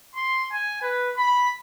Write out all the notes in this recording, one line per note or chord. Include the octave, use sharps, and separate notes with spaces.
C6
G#5
B4
B5